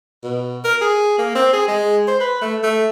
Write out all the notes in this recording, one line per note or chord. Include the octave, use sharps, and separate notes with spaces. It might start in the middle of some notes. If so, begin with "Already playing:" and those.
B2
A#4
G#4
A#3
C4
G#4
G#3
C5
B4
A3
A3